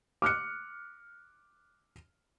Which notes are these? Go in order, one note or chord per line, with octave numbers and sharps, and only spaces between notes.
D6 F6 F#6 C#7